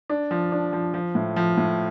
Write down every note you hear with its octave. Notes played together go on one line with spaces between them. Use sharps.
D4
F3
D4
F3
F3
A2
F3
A2